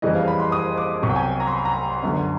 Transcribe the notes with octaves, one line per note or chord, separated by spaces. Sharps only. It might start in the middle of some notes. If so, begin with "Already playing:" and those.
F#1 F2 C#3 E3 G3 D#5
F5
B5
C6
D#6
D6
C2 B2 F#3 C#6
G5
G#5
A#5
C6
B5
A#5
C6
G1 F#2 D3